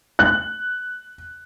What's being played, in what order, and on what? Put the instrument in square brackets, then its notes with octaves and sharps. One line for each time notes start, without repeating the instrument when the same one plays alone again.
[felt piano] F#6